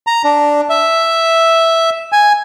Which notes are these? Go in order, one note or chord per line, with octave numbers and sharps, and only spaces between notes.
A#5
D4
E5
G#5